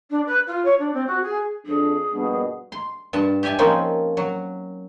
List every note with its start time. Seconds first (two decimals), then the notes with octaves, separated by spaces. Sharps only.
0.10 D4
0.26 B4
0.47 F4
0.65 C#5
0.79 D4
0.93 C4
1.07 F#4
1.22 G#4
1.67 F2 D4 G#4
2.12 A#1 G2 B2
2.72 C6
3.13 G2 A5
3.43 G4 D5 E5 G#5 A5
3.58 F3 A#3 C4 C#4 D#4 F4
4.17 F#3